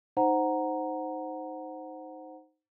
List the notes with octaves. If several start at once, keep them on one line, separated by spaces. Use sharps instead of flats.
D#4 C5 F#5 A#5